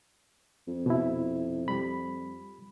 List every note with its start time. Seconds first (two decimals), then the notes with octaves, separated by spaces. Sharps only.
0.68 F2
0.86 B2 E4
1.68 G3 B5